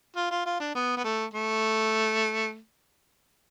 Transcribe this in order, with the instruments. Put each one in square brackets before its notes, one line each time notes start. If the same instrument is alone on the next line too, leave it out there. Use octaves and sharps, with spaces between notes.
[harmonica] F4
F4
F4
D4
B3
B3
A3
A3